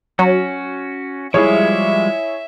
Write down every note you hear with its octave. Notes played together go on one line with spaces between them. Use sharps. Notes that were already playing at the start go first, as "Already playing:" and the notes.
F#3 C#4 F#4
F3 G3 G#3 E4 G#4 C#5 E5